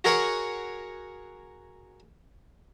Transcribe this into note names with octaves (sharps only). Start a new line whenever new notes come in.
F#4 G#4 A#4 C#5 F#5 C#6